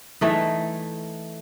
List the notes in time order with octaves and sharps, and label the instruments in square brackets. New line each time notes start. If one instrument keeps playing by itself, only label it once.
[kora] E3 A3 D#4